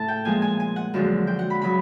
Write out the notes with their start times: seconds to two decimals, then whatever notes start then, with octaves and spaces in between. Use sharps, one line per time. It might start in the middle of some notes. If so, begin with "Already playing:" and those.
Already playing: A2 C#3 A5
0.08 G5
0.25 A#2 F3 G#3 G#5
0.42 G#5
0.60 G#5
0.76 F#5
0.94 F#2 D3 F3 G#3
1.27 G5
1.39 F#5
1.50 B5
1.62 C#3 F#3 B5